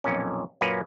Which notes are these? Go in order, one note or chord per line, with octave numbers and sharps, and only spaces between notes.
B1 F2 A#2 C#4
F#2 A#2 A#3 C#4 B4